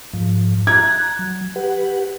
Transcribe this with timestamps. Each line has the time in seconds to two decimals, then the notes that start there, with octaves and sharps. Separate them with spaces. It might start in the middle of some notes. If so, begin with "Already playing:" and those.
0.13 G#2 F3
0.67 A#5 F#6 G#6
1.19 F#3
1.56 G4 B4 F#5